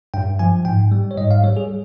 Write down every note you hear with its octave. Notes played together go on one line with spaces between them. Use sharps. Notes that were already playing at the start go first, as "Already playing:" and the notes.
G2 G5
F3 G#5
G#2 G5
G3
C#5
G#2 D#5
F5
G3 C#5
G#4